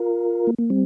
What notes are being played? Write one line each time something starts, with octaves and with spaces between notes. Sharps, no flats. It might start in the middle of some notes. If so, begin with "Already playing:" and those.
Already playing: F4 A#4
A#3
A#3
G3 C4